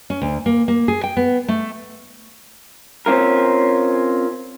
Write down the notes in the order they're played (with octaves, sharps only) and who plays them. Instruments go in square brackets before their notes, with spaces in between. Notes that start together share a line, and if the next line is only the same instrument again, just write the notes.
[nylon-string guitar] C#4
D2
A#3
A#3
G#4
G5
B3
A3
[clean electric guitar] C4 C#4 F4 A#4